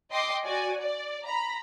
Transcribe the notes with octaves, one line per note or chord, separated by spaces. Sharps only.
D#5 G5 C6 D6
F#4 D5 G#5
D5
A#5 B5